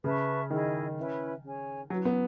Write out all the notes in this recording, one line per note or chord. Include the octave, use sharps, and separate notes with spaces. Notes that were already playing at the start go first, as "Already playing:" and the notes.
C#3 B4 E5 A5 C#6
D#3 E4 G#4 D#5
C#4 E4 B4 E5
C#4 G#4 C#5 G#5
F#3 C#4 E4 B4
B3